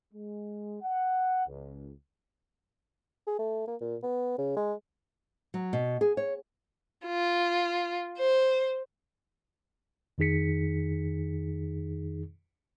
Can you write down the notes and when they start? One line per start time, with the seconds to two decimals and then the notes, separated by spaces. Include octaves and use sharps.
0.13 G#3
0.82 F#5
1.47 C#2
3.27 G#4
3.39 A3
3.67 A#3
3.81 A#2
4.03 B3
4.38 C#3
4.57 G#3
5.54 F#3
5.73 B2
6.01 G#4
6.17 C#5
7.06 F4
8.18 C5
10.18 F2 D#3 D#4 G#4 B6 C#7